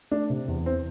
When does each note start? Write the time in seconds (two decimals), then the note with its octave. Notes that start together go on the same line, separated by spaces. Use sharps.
0.12 A3 D4
0.30 C3
0.48 E2
0.66 E3 C4